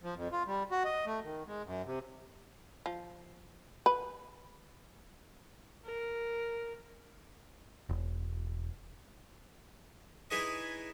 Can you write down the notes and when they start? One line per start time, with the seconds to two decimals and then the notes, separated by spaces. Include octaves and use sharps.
0.03 F3
0.16 F2
0.32 F4
0.47 G3
0.71 F#4
0.85 D#5
1.06 A3
1.23 D#3
1.47 G#3
1.65 F#2
1.86 C3
2.86 F3
3.86 B4
5.86 A#4
7.89 E1
10.31 D#4 E4 G#4 B4 C#5 D#5